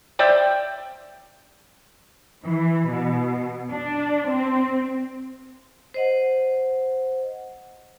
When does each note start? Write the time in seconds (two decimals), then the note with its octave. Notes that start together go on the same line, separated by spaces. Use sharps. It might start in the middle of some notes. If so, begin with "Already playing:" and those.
0.19 C5 D5 E5 G5
2.46 E3
2.90 B2
3.70 D4
4.30 C4
5.94 C5 D#5 F#5